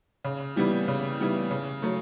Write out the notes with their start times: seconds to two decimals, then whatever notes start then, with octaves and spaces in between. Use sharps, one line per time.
0.24 C#3
0.56 E3 G3 B3 E4
0.88 C#3
1.19 E3 G3 B3 E4
1.51 C#3
1.82 F#3 A3